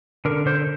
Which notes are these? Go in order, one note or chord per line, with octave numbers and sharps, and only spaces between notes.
D3 A#4
D3 C5